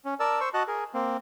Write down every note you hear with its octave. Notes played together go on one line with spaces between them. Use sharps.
C#4
A#4 D5 A5 E6
C5 C#6 E6
F#4 D#5 A5 F#6
G#4 A#4
A#3 C4